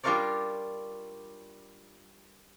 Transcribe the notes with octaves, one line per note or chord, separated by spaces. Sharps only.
G3 D4 F4 A#4 C#5 D5